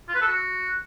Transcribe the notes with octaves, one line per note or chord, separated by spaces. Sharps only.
F4
B4
A4
F#4